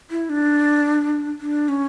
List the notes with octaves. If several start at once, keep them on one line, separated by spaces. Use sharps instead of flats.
E4
D4
D4
C#4